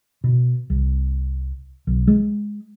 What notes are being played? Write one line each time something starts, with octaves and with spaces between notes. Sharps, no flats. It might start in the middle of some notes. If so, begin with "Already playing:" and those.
B2
C2
B1
G#3